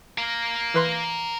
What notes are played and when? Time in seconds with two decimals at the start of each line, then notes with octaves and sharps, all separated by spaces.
0.18 A#4 F5
0.74 E3 B4 C6